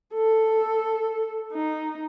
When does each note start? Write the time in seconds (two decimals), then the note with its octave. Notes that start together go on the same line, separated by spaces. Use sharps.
0.14 A4
1.53 D#4